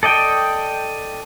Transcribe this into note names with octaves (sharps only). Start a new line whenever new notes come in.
A4 D5 D#5 G5